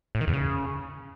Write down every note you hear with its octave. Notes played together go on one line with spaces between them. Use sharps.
A2
D#3
E2
C#3